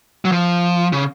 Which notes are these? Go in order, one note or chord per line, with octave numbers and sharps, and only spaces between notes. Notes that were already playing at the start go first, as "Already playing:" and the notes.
F#3
F3
C#3